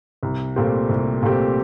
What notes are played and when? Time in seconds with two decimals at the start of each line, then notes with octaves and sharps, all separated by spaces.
0.23 C2
0.56 A#2 A3 C4 G4
0.89 C2
1.23 A#2 A3 C4 G4